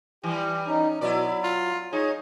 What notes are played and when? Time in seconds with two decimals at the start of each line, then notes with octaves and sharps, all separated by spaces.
0.24 E3 G3 G4
0.67 C#4 D#4
1.01 B2 F#3 E4 D5
1.43 F4
1.93 D#4 G#4 C#5